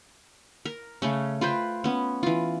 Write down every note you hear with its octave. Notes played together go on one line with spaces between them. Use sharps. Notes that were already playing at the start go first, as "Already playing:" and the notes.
A#4
C#3 A3 C#4
F4 B4 C5 G5
B3 C#4
E3 F4